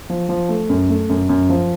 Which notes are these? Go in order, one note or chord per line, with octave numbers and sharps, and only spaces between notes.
F3
F3
A3
F#2
A3
F#2
F#2
F3